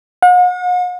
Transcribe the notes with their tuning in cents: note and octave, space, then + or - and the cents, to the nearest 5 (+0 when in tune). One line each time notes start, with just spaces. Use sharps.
F#5 -45